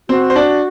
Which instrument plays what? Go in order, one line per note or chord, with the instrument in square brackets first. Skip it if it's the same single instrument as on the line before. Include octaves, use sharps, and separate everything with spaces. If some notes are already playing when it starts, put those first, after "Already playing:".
[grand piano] C4 C5 [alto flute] F#4
[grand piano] C5
D4 D5